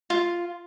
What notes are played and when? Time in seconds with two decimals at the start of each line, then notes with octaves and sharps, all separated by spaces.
0.10 F4